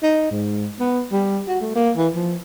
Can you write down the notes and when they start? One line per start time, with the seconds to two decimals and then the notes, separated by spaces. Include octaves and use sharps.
0.03 D#4
0.31 G#2
0.80 B3
1.12 G3
1.48 F#4
1.61 A3
1.75 A#3
1.96 E3
2.15 F3